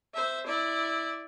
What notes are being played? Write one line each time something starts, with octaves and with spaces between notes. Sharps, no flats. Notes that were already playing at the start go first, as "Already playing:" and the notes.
C5 E5
E4 D5